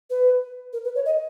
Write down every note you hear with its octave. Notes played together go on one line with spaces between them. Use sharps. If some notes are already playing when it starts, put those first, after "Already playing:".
B4
A#4
B4
C#5
D#5